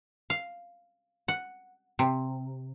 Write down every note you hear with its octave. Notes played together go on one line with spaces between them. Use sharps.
F5
F#5
C3